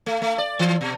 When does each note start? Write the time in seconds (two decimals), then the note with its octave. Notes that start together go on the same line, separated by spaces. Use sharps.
0.06 A3
0.22 A3
0.38 D5
0.59 E3
0.81 B2